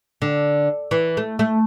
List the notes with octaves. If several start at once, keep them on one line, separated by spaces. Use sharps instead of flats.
D3
E3
A3
A3